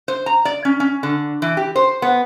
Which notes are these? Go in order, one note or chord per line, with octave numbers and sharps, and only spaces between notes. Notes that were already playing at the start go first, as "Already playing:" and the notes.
C5
A#5
D5
C#4
C#4
D3
E3
G4
C5
B3